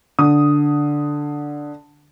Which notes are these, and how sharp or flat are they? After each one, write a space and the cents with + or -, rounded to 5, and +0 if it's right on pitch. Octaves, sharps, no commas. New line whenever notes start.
D3 +0 D#6 +0